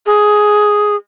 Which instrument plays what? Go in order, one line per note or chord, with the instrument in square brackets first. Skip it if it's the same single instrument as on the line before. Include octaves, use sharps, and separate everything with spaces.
[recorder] G#4